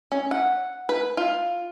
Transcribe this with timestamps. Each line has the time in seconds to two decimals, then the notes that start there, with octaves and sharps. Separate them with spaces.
0.12 C#4
0.31 F#5
0.89 B4
1.17 F4